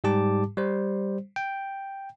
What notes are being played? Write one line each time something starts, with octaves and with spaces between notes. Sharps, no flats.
G#2 G3 G4 A5 D6
G3 C5
G5